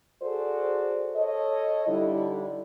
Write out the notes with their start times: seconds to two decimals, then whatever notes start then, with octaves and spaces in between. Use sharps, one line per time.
0.23 F#4 G#4 A4 C5 D5
1.16 A4 C#5 D#5
1.87 D3 G3 D#4 E4